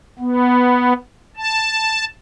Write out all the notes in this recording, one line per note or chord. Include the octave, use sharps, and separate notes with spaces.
B3
A5